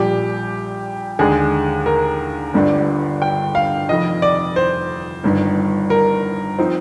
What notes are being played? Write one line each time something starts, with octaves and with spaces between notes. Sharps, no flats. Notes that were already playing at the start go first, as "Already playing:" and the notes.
Already playing: A#1 A#2 G3 G4
D#2 D3 G#3 D4 G#4
A#4
G1 G2 D3 G3 D4
G5
F5
F1 F2 D#3 D#5
D5
C5
G1 G2 D#3
A#4
F3 C4 D#4